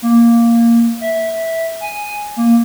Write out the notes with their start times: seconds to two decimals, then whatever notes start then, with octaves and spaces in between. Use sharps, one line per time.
0.02 A#3
1.01 E5
1.81 G#5
2.37 A#3